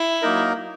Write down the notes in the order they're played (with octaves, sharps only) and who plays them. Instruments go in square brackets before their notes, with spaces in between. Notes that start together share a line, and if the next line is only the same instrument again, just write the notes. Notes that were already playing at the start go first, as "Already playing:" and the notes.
Already playing: [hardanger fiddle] E4
[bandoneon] F#3 A#3 D#4 A#4